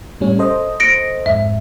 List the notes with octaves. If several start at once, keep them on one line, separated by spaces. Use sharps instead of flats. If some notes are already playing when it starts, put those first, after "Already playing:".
A2 G3 C#4
A4 C5 D#5
A#6 C#7 D7
F2 G#2 E5